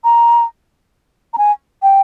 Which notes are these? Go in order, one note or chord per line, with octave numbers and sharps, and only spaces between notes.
A#5
A#5
G#5
G5